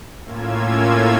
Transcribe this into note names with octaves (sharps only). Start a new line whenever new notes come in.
A2 A#3 C#4 F4 E6 G#6